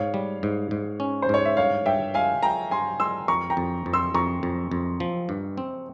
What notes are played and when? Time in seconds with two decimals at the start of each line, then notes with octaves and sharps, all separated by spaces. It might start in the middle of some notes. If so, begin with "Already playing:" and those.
Already playing: G#2 C#5 F5
0.14 G3
0.43 G#2
0.71 G#2
1.00 C#4
1.22 C5
1.29 G#2 C#5
1.45 E5
1.57 G2 C#5 F5
1.86 G2 E5 G5
2.14 G#3 F5 G#5
2.43 G#3 G5 A#5
2.71 G2 G#5 C6
3.00 G#3 C6 E6
3.28 F2 A#5 C#6
3.50 G5 A#5
3.57 F2
3.86 F2
3.93 C6 E6
4.14 F2 A#5 C#6
4.43 F2
4.71 F2
5.00 F3
5.29 G2
5.57 C4